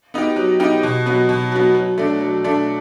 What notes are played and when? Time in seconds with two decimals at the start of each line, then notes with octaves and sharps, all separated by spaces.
0.14 B3 D#4 G4
0.36 F#3
0.60 B3 D#4 G4
0.83 B2
1.06 F#3 B3
1.29 B2
1.52 F#3 B3
1.75 F#3
1.98 A3 D4
2.21 F#3
2.44 A3 D4